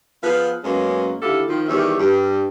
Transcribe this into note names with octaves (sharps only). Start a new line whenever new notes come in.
F3 B3 G#4 B4 F5
F#2 G#3 A#3 B3 C#4
D#2 D3 E4 G4 A4 F5
D#3 F3
E2 D#3 G3 G4 C#5 E5
G2 G4